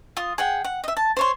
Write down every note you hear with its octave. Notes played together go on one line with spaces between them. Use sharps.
F4 D#6
G#4 F#5 G5
F#5
D#5 E5
A5
C5 C#5 C6